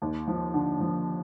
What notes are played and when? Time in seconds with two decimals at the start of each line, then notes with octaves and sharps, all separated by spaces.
0.02 D#2
0.27 F3
0.54 D3
0.80 F3